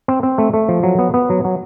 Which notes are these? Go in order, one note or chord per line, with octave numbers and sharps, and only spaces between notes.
C4
C4
A3
A3
F3
F#3
B3
B3
F#3
F#3